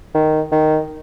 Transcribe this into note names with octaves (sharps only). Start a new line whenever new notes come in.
D#3
D#3